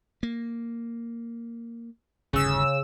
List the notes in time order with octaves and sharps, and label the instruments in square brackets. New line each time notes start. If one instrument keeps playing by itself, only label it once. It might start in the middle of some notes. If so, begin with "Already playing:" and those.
[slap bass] A#3
[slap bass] G1 D#2 A2 [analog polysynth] C#3 E6